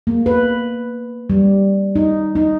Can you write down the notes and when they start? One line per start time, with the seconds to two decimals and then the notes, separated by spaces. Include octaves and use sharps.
0.07 A#3
0.26 B4
1.30 G3
1.96 D#4
2.36 D#4